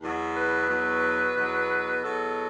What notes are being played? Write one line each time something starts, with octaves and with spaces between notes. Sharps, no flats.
E2 B2 F#3
B4
E2 B2 F#3
E2 B2 F#3
E2 B2 F#3 A4